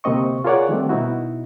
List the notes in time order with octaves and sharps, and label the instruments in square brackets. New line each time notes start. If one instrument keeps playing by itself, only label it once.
[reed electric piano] D2 C3 A#3 C4 D#5 C#6
F4 G#4 A#4 C#5 D5 F#5
D#3 G3 A3 C4
B2 D#4 E4 F#4